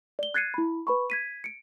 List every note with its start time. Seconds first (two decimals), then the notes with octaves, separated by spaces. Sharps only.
0.19 D5 G7
0.34 F#6 G#6 A6 C7 C#7 D#7
0.54 E4 B5
0.87 B4 B5 C#6
1.10 G#6 B6 D#7
1.44 C#7 D7